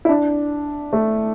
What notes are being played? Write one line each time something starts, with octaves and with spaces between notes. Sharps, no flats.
E4
D4
A3